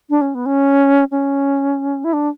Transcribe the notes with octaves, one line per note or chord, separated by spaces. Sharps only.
D4
C#4
B3
C#4
C#4
E4
D4